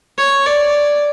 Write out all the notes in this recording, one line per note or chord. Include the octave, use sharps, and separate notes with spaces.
C#5
D5